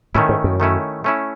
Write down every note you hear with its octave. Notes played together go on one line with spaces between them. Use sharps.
A2 D#3 A3 C#4 E4
G#2
F#2
D#3 A3 C#4 E4
A3 C#4 E4